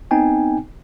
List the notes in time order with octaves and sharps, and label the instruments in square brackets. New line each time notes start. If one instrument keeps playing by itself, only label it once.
[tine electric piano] B3 C4 D#4 G5 G#5